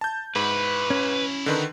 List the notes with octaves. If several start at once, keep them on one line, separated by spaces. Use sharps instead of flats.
A5 G6
G#2 E4 F#4 B4
C#4
D3 D#3 B4